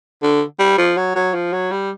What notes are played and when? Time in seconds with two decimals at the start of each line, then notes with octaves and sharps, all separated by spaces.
0.23 D3
0.59 G3
0.78 F3
0.97 F#3
1.15 F#3
1.34 F3
1.53 F#3
1.71 G3